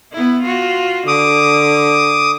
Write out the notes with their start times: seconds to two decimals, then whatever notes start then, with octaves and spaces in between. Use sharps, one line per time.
0.12 B3 E4
0.42 F4 F#4
1.07 D3 D6 D#6